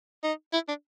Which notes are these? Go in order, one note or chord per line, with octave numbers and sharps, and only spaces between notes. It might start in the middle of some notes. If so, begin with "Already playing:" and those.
D#4
E4
D4